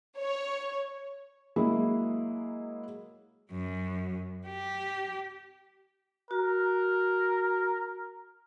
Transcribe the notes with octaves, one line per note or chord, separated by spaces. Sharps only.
C#5
F#3 G#3 A#3 E4
F#2
G4
F#4 A#4